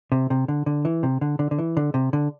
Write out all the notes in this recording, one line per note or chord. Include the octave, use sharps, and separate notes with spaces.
C3
C3
D3
D3
E3
C3
D3
D3
D3
E3
D3
C3
D3